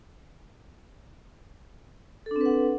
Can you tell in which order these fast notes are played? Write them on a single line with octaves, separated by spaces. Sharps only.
A4 D4 C4 B4 F#5